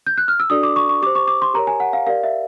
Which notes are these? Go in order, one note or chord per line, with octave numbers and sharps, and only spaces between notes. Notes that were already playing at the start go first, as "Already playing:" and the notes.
G6
F#6
F6
E6
D4 F#4 A4 D5 D#6
D6
C#6
C#6
G4 C5 D6
C#6
D6
C6
G4 A#4 C#5 A#5
G#5
F#5
F5
G4 A#4 D5 F5
E5